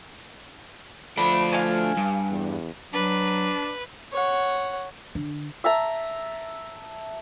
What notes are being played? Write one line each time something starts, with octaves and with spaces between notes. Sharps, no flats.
F3 A3 D4 B5
F5 G#5
G2
E2
F#3 D4 B4
C#5 F#5
D3
E5 A5 A#5